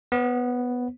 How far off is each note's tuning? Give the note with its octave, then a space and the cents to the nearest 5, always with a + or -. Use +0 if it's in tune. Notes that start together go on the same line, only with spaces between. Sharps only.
B3 +0 C#5 -45